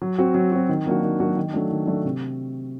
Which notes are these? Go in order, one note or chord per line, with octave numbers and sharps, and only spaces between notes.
F#3
C4 F#4
F#3
C4 F#4
D#3
F#3 A#3 D4 F#4
D#3
F#3 A#3 D4 F#4
D#3
F#3 A3 D4
D#3
F#3 A3 D4
C3